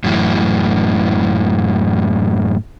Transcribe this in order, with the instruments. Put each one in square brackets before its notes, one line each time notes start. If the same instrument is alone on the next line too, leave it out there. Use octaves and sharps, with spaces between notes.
[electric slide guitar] F#2 A2 E3